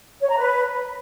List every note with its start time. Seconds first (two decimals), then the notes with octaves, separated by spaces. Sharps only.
0.21 C#5
0.29 A#5
0.37 B4